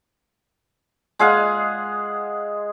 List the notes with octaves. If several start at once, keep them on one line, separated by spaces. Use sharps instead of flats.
G#3 G#4 F5 F#5